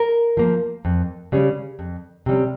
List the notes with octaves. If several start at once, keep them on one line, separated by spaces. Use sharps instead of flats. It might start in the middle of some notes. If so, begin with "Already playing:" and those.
Already playing: A#4
F3 A#3
F2
C#3 G3 C#4
F2
C3 G3 C#4